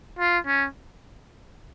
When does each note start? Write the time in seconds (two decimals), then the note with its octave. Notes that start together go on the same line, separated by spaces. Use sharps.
0.19 F4
0.47 C#4